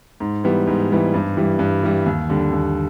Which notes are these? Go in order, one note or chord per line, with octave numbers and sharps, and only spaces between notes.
G#2
E3 G3 B3
G#2
E3 G3 B3
G2
E3 G3
G2
E3 G3
D#2
D3 G3
D#2